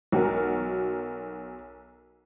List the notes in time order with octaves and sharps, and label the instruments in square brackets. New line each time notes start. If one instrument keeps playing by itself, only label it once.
[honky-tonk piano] B1 F#4 A#4